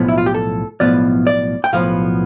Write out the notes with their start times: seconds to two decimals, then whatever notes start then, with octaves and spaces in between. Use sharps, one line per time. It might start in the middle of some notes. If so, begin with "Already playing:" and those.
Already playing: B1 A2 F3 B3
0.08 E4
0.18 F4
0.26 G4
0.34 A4
0.80 B1 A2 F3 B3 D5
1.27 D5
1.64 G5
1.73 B1 A2 F3 B3 F5